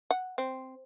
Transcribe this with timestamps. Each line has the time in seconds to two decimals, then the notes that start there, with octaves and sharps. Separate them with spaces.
0.11 F#5
0.38 C4